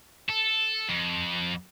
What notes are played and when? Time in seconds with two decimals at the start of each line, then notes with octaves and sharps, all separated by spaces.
0.29 A4
0.89 F2